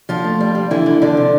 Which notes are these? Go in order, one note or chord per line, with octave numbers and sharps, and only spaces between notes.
D3 F3 F4
A3
G3
G3
D3 E3 E4
D3
D3 F3 D4
C3